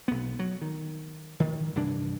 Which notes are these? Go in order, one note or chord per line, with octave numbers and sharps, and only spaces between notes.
B1 B3
F#3
D#3
D#3
C2 G2 E3 D4